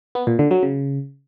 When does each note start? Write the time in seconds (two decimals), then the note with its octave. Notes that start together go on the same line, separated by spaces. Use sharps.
0.15 B3
0.27 A#2
0.39 D3
0.51 F#3
0.63 C#3